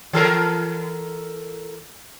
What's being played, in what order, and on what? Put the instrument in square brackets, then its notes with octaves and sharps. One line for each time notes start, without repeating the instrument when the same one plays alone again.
[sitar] E3 A4 A#4